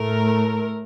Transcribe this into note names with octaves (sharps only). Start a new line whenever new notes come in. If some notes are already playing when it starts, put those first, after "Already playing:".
Already playing: A2 A3 A#4